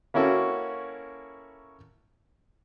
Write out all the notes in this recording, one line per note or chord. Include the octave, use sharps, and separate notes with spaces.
A#3 C#4 E4 F#4 A4